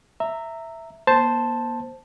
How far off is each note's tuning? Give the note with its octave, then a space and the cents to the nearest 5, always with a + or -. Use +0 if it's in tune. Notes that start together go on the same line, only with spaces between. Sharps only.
E5 +0 A#5 -20
A#3 +40 C5 +0 A5 +0